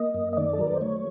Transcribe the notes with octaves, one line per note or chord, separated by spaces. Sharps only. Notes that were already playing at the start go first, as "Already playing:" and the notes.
Already playing: A#3 D#5
F#2
D#5
D#3 D5
A4
F#3 A#4
B4
C5
A3 C#5